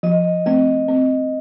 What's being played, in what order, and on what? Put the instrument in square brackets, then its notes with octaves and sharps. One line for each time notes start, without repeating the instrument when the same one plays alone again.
[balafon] F3 [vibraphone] D#5
[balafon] A3 C4 [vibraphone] D#5
[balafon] C4